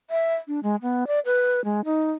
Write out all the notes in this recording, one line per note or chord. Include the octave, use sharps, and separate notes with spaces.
E5
D4
G#3
B3
D5
B4
G#3
D#4